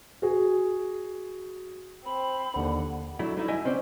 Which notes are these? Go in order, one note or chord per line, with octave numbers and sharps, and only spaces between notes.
F#4 G#4
C4 B5
D#2 D3 F#5
F#3 A3 D4 E4
G3 A3 D#4 E4
F#2 A3 E4 D#5 E5 G#5
C4 C#4 C5 D5